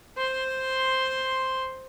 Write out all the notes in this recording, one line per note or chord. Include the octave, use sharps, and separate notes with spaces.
C5 C6